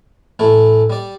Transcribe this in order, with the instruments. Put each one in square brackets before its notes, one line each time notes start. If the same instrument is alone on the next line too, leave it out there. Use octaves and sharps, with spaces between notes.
[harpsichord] A1 A3 E4 A4
G3 D5